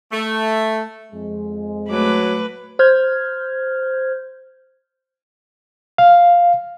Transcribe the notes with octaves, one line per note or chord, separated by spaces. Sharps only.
A3
F2 G#3
F#3 A3 B4 D6
C5 F6 G6 G#6
F5